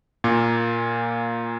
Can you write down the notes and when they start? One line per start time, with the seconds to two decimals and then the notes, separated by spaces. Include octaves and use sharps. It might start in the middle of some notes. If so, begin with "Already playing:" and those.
0.24 A#2 A#3